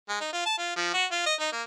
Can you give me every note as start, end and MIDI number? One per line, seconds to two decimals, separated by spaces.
0.09 0.16 56
0.21 0.30 63
0.33 0.42 65
0.45 0.55 81
0.58 0.75 65
0.76 0.92 53
0.94 1.05 66
1.11 1.24 65
1.26 1.34 75
1.40 1.51 63
1.52 1.62 58